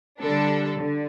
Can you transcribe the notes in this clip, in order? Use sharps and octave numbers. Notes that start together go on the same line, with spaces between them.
D3 G3 D4 A4
D3